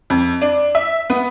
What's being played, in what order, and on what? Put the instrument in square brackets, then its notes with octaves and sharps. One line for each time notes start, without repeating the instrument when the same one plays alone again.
[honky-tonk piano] F2
D4
E5
B3